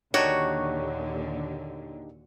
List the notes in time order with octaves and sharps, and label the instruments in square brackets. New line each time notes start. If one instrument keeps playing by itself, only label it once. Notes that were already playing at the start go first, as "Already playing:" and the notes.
[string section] D#2 A#2 D3 [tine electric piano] D4 D#4 G4 [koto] F#4 [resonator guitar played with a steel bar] C#5